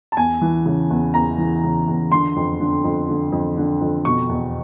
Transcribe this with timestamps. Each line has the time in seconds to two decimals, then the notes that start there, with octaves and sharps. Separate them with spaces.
0.12 A5
0.17 E2 G#5
0.41 E3
0.66 C#3
0.91 E2
1.14 E2 A#5
1.38 E3
1.64 C#3
1.88 E2
2.12 D3 C6
2.36 F2
2.60 D3
2.84 F2
3.09 D3
3.32 F2
3.57 D3
3.81 F2
4.05 B2 C#6
4.29 E2